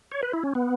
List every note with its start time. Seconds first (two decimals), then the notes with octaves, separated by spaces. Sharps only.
0.12 C#5
0.23 B4
0.33 E4
0.44 C#4
0.55 B3